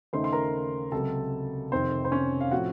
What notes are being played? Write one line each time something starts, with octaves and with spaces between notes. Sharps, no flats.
D#2 C#3 A3 D#4 C5 C6
C6
A#4 A#5
C#2 C3 F#3 A4 A5
F1 F2 C3 D#3 C4 C5
C5
C#4 C#5
F5
A2 F3 C4 F#4 F#5